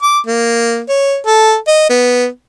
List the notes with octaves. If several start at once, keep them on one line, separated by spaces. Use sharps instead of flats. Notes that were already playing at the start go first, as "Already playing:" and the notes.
D6
A#3
C#5
A4
D#5
B3